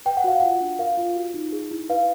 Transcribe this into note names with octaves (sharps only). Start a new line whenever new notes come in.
B4 G5
F#5
F#4 F5
F4 F#5
D4
A#4 F5
F4
F#4
D#4
G#4
E4
B4 F5